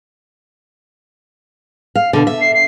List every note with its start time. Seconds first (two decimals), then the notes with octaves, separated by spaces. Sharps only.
1.96 F5
2.13 B2 D3
2.27 E5
2.41 C7
2.54 C7